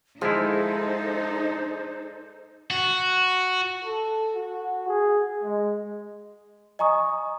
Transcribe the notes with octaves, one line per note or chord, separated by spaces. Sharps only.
F3 G#3 D#4 E4 A4 C5
F#4
A4
F#4
G#4
G#3
D#5 G#5 A#5 C#6 D#6